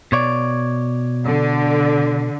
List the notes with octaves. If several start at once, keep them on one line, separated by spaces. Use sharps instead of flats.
B2 C#5 D5
D3